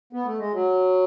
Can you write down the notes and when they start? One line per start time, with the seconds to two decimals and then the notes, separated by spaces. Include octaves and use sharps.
0.13 B3
0.25 A3
0.38 G#3
0.53 F#3